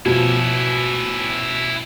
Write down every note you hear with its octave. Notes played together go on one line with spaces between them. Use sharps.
B2 F3 C#4 E4